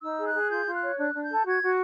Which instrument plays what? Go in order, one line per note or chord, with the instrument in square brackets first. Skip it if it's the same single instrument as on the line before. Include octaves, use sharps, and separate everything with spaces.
[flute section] D#4 E6
G#4
F#6
G#4
F4 G6
F4
F#6
C#5
D4 F#6
D4
G6
A4
F#4 G#6
F#4